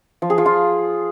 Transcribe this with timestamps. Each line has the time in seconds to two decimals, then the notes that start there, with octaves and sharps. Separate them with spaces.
0.22 F3
0.30 G#4
0.38 F3
0.46 F4